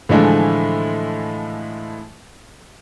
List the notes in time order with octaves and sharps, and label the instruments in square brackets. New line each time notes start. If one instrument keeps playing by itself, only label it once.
[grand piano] A2 D3 E3 F3 G#3 A3